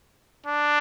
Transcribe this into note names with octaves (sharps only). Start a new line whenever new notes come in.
D4